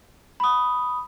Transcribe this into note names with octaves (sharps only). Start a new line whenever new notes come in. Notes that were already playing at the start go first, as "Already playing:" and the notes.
B5 D#6